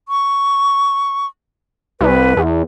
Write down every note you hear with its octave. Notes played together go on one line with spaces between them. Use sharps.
C#6
C2 B4
E2